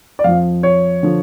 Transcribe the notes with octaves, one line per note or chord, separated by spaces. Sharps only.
D5
F2 F3 F5
C#5
D3 F3